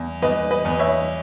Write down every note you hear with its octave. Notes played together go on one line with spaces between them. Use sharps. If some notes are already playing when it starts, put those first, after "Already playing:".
Already playing: E2
E2 B4 D#5
B4 D#5
E2
C#5 E5